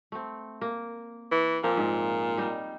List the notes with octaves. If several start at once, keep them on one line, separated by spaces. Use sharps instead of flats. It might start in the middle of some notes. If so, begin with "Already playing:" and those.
A3 C4
A#3
E3
A#2 F3 A#3 C4
G#2
G3 D#4